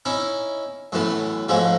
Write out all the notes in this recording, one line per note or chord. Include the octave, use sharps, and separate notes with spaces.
C#4 D#4 E4
F#2 A2 E3 B3
G#2 F3 F#3 G#3 A3